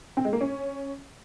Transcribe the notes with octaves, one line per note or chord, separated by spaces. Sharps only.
C4
G#3
A#3
C#4